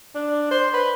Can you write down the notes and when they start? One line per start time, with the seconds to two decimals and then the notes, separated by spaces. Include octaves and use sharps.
0.15 D4
0.51 C5
0.74 B4